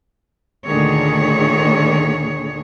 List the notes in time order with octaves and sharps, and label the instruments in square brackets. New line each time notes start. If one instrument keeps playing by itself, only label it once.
[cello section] D2 A#2 D3 D#3 G#4 C#5